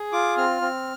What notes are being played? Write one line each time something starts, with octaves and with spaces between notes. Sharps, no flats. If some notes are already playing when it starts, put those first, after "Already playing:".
Already playing: G#4
F4 D6
C4 F6
C4